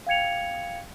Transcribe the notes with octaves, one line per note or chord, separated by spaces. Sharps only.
F5 G5 G#6 C#7 F7